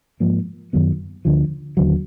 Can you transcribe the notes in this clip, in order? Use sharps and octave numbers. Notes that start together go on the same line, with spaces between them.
G#2 F3 A#3
F#2 D#3 F#3 B3
D2 D3 F3
D#2 D3 F#3